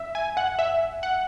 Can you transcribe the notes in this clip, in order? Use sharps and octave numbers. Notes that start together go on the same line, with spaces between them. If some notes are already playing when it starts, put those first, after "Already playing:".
Already playing: F#2 E5
G#5
F#5
E5
F#5